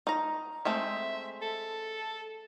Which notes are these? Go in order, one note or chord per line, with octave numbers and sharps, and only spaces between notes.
D#4 A#5
G#3 A3 C4 E5
A4